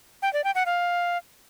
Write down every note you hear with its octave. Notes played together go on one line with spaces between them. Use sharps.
G5
D5
G5
F#5
F5